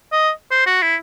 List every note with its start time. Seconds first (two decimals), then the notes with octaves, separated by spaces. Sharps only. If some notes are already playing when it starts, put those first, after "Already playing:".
0.12 D#5
0.51 C5
0.66 F#4
0.82 E4